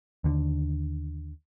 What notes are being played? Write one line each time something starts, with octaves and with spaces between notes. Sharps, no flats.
D#2 D3